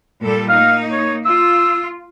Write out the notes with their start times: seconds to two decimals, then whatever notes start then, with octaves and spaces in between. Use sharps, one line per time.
0.21 A#2 G3 A4
0.49 A#3 D#4 F5
0.92 C#5
1.25 F4 E6